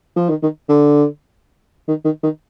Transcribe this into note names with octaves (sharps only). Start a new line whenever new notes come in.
F3
D#3
D#3
D3
D#3
D#3
D#3